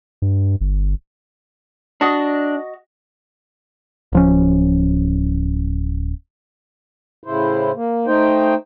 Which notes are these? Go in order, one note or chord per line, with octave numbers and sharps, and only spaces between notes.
G2
G1
D4 F#4 D#5
D1 F3 C#4
A2 C#3 E4 C5
A#3
A3 D#4 C5 G5